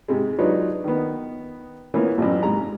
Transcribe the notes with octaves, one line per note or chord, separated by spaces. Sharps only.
G#2 C3 G#3
F#3 D4 D#4 F4 B4 C#5
D#3 B3
E3 A#3 B3 C#5
A1 F#2
G#2 C3 A#5